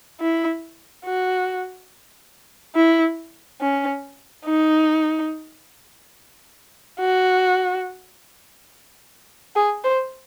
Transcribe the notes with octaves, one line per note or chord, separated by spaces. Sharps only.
E4
F#4
E4
C#4
D#4
F#4
G#4
C5